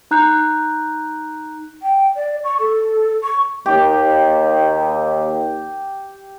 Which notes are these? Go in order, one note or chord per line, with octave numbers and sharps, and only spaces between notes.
D#4 A#5 F#6 G6
G5
D5
C#6
A4
C#6
D#2 G4